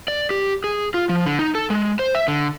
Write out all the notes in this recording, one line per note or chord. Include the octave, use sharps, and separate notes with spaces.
D5
G4
G#4
F4
F3
D3
D#4
A4
G#3
C5
E5
D3